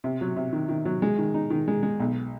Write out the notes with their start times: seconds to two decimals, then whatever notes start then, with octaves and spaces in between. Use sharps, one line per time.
0.04 C3
0.21 F#3
0.36 C3
0.53 D#3
0.69 D#3
0.85 F#3
1.02 G#3
1.18 D#3
1.34 D#4
1.50 D#3
1.68 G#3
1.83 G#3
2.00 B1